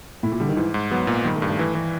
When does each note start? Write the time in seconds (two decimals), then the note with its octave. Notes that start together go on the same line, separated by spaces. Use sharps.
0.23 A2 E4
0.32 A#2
0.40 D3 G3
0.49 D#3
0.56 G#2 E3
0.74 G#2
0.91 F#3 B3
1.07 A#2
1.25 D#3 G3
1.36 A3
1.42 G2
1.48 A3
1.59 E3
1.75 E3